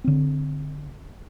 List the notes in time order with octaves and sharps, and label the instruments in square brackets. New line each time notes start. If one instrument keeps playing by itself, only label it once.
[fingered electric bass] D3 C4